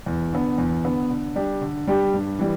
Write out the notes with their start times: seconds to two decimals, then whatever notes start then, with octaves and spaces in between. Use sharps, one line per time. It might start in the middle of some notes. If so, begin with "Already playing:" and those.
0.06 E2
0.33 D3 B3
0.58 E2
0.84 D3 B3
1.10 D3
1.35 G3 D4 G4
1.61 D3
1.87 G3 D4 G4
2.14 G2
2.39 E3 G3